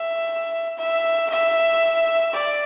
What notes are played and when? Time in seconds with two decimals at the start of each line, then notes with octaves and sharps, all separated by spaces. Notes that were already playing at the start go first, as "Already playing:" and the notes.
Already playing: E5
0.78 E5
1.30 E5
2.34 D5